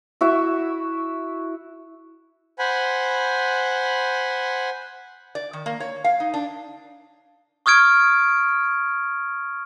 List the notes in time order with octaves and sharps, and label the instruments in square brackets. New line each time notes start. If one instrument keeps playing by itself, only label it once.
[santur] E4 F#4 E5
[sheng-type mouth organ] C5 F#5 G#5 B5
[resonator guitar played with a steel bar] D5
D#3
A#3
C#5
F5
D#4
D4
[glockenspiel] C#6 D#6 F6 G#6 D7